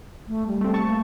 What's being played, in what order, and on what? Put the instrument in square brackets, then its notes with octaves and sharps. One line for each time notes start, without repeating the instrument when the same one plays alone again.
[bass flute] A3
G3
[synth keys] A3 C4
A5 C#6
[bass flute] A#3